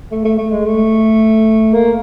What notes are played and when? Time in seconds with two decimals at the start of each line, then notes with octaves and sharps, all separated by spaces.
0.11 A3
0.25 A3
0.38 A3
0.52 G#3
0.65 A3
1.73 A#3